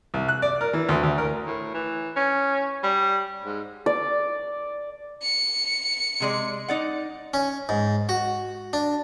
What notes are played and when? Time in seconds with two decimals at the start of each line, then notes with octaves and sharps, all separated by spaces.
0.14 C2
0.28 F#6
0.42 D5
0.61 A#4
0.73 E3
0.89 D2
1.03 D2
1.18 A#4
1.46 A2
1.74 E3
2.16 C#4
2.83 G3
3.45 G#2
3.86 D5
5.23 C#7
6.20 C3 G#3 D5
6.68 D#4 D5 F#5
7.34 C#4
7.69 G#2
8.09 F#4
8.73 D4